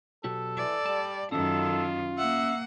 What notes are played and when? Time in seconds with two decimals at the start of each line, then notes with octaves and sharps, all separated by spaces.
0.24 B1 F#4 G4 A4
0.57 E3 D5
0.86 G3 A5
1.32 F#2 D#3 C#4 F4 A4
2.18 A#3 E5 F#5